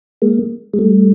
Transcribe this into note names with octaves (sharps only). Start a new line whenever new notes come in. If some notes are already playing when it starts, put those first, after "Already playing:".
G#3 A#3
G#3
G3 A3